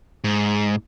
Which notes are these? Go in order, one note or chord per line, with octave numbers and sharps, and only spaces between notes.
G#2